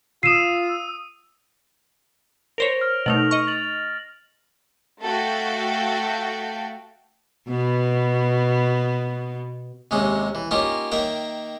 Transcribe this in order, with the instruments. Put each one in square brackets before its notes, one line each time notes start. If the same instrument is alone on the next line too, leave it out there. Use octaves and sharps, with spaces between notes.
[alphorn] F4 [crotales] D#6 D#7 [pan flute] E6 [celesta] C7 E7
[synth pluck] A#4 C5 C#5 [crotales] A#6 D7 F7
[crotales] F6
[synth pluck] B2 A3 D#4 [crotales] F7 F#7
[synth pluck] D#5 C#6
[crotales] A6 F#7
[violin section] A3 F#4 A4 F5 G5
[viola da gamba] B2 B3
[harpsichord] D#2 C3 G#3 C#4 D#4
E3
A#3 C#4 D#4 F4 G4
D#3 A#3 E5 G5 A#5